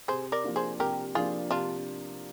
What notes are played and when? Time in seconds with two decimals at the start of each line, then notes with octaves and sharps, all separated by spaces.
0.08 C3 G#4 C5
0.32 A#4 D5
0.44 F3 A#3 D4
0.56 G#4 C5
0.79 C3 G4 A#4
1.15 F3 A#3 D4 F4 G#4
1.50 C3 D4 F4